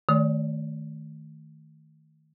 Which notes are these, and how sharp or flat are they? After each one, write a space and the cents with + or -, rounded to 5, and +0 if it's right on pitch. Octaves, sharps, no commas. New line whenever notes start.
D#3 +0 A3 +0 D5 +0